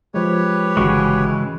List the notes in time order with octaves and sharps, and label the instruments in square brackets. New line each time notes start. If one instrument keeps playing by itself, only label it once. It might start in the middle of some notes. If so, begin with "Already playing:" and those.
[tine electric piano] F3 G#3 [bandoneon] G4 B4 C#5
[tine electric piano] G1 F#4 C#6 [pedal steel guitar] C#3 E3 G#3